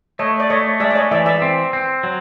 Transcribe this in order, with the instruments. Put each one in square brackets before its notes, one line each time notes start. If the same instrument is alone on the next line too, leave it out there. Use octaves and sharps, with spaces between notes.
[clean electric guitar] A3 [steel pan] C#5 D#5
[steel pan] D5
[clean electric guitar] A3 [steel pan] C#5 D#5
[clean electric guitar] G#3 [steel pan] D5 E5
[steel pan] D5
C#5 D#5
[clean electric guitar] E3 [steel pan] D5 E5
[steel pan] D5 E5
[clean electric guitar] C4
C4
F#3